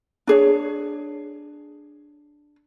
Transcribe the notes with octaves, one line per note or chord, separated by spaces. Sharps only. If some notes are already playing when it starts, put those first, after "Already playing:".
D4 G#4 C#5